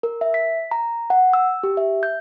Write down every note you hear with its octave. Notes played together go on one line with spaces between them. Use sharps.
A#4
E5
B6
A#5
F#5
E6
G4
E5
G6